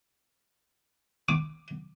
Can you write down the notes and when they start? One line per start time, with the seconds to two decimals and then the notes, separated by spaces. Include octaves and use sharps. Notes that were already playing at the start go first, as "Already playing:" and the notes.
1.29 D6